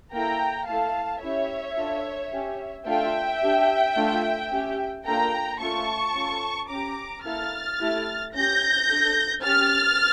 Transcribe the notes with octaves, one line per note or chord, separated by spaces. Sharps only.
A#3 E4 A4 G5 A#5
A3 E4 A4 F5 A5
C#4 E4 G4 C#5 E5
D4 F4 A4
C#4 G4
A3 D4 F4 A4 E5 G5
D4 G4
A3 D4 F4
C#4 G4
A#3 D4 F4 A4 G5 A#5
A3 C#4 F4 A4 A5 C#6
C#4 F4 A4
C#4 G4 A#5 D6
A#3 E4 A4 F6 A6
A3 E4 G4
C#4 G4 G6 A#6
D4 A4
C#4 G4 F6 A6